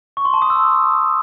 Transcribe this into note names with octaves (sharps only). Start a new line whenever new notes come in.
C#6
C6
A5
D#6
E6